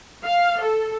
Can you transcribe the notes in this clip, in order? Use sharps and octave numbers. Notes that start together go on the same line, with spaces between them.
F5
A4